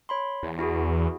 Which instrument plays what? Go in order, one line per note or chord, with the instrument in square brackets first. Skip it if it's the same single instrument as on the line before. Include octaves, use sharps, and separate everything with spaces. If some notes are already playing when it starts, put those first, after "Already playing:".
[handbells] C#5 B5 C6
[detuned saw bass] E2
[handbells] E4 F#4 G#4